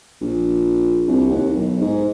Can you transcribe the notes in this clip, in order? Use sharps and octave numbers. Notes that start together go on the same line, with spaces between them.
A#1
C2
D#2
B1
G#2